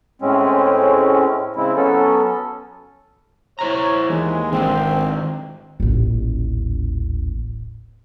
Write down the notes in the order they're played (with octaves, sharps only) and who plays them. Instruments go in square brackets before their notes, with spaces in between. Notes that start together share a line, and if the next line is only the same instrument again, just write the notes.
[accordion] A2 G#3 C4 C#4
C#3 G#3 C4 E4
F#3 B3 C#4 A4
[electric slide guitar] E4 C5 A#5 [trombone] C#5
[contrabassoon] D#2 [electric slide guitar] E3 [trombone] G#3
[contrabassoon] G#1 [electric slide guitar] D#3 F3 D4 [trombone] C4
[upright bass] D#1 A1